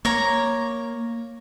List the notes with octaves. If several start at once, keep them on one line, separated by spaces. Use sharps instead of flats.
A#3 C#5 A#5